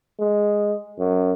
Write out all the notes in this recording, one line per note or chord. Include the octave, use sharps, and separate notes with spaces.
G#3
F#2